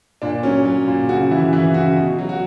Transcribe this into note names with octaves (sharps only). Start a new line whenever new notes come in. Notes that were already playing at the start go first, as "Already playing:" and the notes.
A#2 D4
F#3 C#4
F#3
A#2
C#3 F#4
E3 E4
E3 E4
C#3 F#4
B2
F#3
F#4